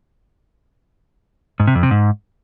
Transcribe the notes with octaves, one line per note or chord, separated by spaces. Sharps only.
G#2
C3
F2
C3
G#2